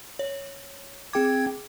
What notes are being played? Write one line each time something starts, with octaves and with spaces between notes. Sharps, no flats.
C#5
C4 G#4 G5 D6 G#6